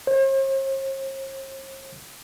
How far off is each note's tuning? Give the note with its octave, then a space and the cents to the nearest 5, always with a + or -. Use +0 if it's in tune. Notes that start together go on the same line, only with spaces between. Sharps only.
C5 +45